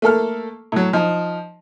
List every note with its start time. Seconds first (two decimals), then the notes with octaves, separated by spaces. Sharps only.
0.02 A3 A#3 A4 F6
0.72 A2 F#3
0.93 F3 D#4